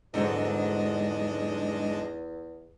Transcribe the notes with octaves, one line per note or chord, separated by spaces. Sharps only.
E2 G#2 D3 F#3 G#3 D4 D#5